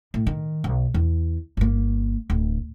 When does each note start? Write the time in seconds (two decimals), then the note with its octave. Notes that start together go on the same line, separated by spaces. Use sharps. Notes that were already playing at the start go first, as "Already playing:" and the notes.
0.14 A2
0.27 D#3
0.64 B1
0.94 E2
1.57 G1 A#3
2.30 D1